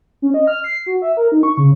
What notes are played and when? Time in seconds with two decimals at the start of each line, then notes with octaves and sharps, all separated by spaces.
0.22 C#4
0.34 D#5
0.47 F6
0.64 C7
0.86 F#4
1.02 E5
1.17 A#4
1.32 D#4
1.43 C#6
1.57 C#3